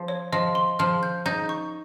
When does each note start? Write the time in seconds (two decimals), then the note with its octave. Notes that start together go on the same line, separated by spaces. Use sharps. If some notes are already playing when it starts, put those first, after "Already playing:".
Already playing: F3
0.08 C#5
0.33 F3 D#5
0.55 C6
0.79 F3 F6
1.03 G6
1.26 D#4 G6
1.49 C#6